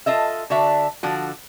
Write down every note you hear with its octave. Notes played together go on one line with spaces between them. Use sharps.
F4 A4 D#5 E5
D3 D4 F#4 E5
D3 F3 F#4